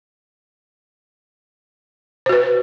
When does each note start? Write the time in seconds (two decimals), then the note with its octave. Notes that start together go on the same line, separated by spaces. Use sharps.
2.26 C5
2.29 F#4
2.33 B4